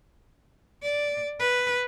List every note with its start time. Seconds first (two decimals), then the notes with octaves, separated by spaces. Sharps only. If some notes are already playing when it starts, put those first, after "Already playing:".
0.82 D5
1.39 B4